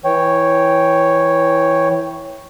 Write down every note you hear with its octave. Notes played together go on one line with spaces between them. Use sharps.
E3 C#5 G5